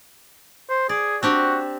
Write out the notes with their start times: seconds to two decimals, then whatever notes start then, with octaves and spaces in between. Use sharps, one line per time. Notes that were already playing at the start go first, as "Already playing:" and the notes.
0.70 C5
0.89 G#4 D5
1.23 C4 D4 F#4 G4